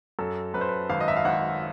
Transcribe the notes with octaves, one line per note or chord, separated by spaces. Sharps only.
F#2 A4
F#2 B4
C5
B4
G#1 F5
D#5
E5
F5
G#1 F#5